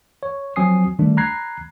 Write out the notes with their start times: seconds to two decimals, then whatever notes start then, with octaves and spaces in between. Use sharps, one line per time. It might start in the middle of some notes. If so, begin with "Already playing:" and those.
0.23 C#5
0.56 F3 F#3 C4 G#5 D#6 C7
0.99 D3 D#3 G3 A3 D4
1.17 A#5 B5 F#6 G#6 A#6 C7